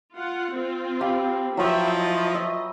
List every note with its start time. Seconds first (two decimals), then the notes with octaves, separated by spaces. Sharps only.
0.16 F4 F#5
0.54 C4 F4
1.01 G4 F5 B5
1.57 F3 F#3 E4 B4 E5 G5 C#6
1.98 D#5
2.34 E5